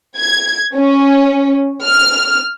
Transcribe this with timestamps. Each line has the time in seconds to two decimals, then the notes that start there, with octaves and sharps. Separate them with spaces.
0.17 G#6
0.76 C#4
1.85 F6